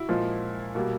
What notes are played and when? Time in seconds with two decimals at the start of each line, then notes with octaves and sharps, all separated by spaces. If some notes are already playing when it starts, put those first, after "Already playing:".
Already playing: E4 F#4
0.09 A#2 F3 G#3
0.75 B2 G3 A#3